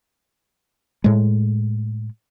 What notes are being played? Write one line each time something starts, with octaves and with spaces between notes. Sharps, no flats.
A2 G#3